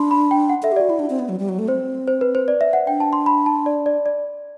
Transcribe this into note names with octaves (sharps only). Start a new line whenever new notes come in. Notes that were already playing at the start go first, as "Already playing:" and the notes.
Already playing: D4 B5 C6
B5
G5
F#5
A4 E5
G4
F#4 D5
E4
D4
C4
B3
F#3
G3
F#3
A3
C4 C5
C5
B4
C5
D5
E5
F#5
D4 G5
A5
C6
B5
A5
D5
D5
D5